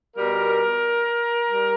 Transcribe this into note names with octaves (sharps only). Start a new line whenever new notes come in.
B2 G3 A#4
G3